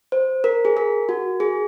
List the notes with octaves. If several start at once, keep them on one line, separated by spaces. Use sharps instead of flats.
C5
A#4
G#4
A#4
F#4
G#4